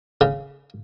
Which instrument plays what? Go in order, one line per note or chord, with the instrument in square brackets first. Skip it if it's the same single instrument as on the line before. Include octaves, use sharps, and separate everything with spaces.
[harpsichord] C#3